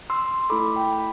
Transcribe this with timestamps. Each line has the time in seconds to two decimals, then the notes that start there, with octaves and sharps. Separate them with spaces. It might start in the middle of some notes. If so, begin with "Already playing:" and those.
0.10 C6 E6
0.50 A3 E4 A4 B5 D6
0.76 G5 B5
0.93 B5